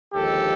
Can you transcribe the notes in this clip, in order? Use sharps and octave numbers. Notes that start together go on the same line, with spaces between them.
D#2 D3 F3 G#3 G4 A4